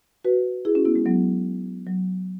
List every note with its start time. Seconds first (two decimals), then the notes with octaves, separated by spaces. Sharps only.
0.25 F#4 B4
0.65 E4 G#4
0.75 C#4 F#4
0.85 B3 E4
0.96 G#3 C#4
1.06 F#3 B3
1.87 F#3